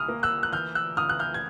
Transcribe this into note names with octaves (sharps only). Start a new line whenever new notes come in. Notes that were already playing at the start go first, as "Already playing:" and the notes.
Already playing: C2 D#6 F6
A#3
E6 F#6
F#6
E3 F6 G6
E6 F#6
C#2 D#6 F6
F#6
F6 G6
G#6